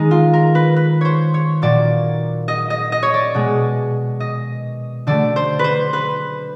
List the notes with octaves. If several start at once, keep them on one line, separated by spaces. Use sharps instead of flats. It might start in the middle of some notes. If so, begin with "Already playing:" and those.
Already playing: D#3 G#3 D#4
F4
A#4
B4
B4
C5 C#5
C#5
A#2 F#3 A#3 D5
D#5
D#5
D#5
C#5
D5
B2 G#3
D#5
D3 F#3 A3 D5
C5
B4 C5
B4